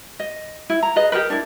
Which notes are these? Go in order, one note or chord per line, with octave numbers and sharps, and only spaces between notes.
D#5
E4
A#5
G#4 B4 D#5
G4 G#4 A#4 B4
D4 E4